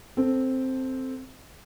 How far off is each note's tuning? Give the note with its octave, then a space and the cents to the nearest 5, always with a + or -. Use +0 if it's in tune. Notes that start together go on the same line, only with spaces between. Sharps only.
C4 +0 A4 +0